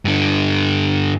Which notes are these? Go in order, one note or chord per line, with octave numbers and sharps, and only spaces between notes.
G2 D3